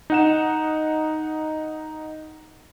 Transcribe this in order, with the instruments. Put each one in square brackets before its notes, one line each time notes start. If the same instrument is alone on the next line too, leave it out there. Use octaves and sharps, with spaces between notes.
[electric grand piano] D#4 F#5 E7